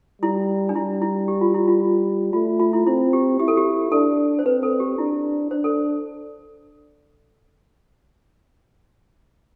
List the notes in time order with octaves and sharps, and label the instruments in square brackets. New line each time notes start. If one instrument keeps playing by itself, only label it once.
[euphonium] G3 [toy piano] E4
[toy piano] D4
[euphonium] G3 [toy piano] E4
[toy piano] E4
G4
F4
E4
F4
[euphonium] A3 [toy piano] F4
[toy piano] F4
E4
[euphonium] C4 [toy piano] E4
[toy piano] G4
[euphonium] E4 [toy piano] G4
[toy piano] A4
G4
[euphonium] D4 [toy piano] A4
[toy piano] C5
[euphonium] C4 [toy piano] B4
[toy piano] A4
G4
[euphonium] D4 [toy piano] E4
[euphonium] D4 [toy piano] C5
[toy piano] A4